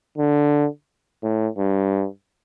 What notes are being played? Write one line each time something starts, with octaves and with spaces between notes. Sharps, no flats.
D3
A2
G2